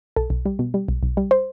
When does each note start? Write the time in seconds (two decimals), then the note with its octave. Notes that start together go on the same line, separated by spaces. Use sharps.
0.16 B1 A4
0.30 B1
0.45 G3
0.59 B2
0.74 G3
0.89 B1
1.03 B1
1.17 G3
1.31 C5